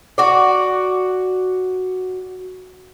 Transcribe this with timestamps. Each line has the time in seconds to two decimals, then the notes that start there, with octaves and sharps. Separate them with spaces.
0.18 F#4 D5